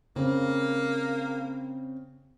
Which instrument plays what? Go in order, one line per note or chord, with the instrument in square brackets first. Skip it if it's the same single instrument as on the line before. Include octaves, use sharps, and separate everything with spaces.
[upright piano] C#3 [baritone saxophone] A#3 [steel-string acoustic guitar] C4